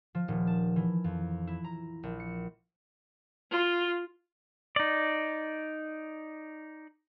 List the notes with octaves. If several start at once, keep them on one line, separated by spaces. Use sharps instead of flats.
F3
D#1
A5
E3
F2
E4
A#5
A#1
C#7
F4
D#4 D5